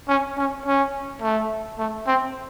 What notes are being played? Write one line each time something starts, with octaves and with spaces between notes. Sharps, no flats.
C#4
C#4
C#4
A3
A3
C4